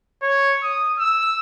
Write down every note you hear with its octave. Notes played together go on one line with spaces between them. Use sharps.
C#5
D#6
E6